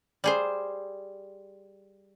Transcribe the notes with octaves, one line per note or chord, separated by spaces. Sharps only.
G3 G#4 C5